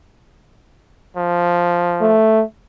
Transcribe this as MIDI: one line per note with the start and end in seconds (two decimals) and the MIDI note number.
1.17 2.20 53
2.01 2.42 57